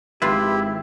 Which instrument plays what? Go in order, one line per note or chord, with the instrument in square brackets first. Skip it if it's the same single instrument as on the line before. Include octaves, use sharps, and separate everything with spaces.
[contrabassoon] G#1 [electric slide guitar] E4 [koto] F4 B4 [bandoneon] G4